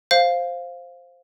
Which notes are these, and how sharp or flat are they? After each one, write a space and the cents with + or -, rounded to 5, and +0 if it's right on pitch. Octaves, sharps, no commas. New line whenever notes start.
C5 +5 F5 +0